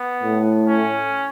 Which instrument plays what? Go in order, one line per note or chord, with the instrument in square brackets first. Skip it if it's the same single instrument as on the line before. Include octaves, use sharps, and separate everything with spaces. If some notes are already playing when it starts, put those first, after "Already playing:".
Already playing: [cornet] B3
[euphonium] A2
[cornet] C#4